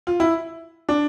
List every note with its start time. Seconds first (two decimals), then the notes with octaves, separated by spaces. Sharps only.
0.07 F4
0.20 E4
0.89 D4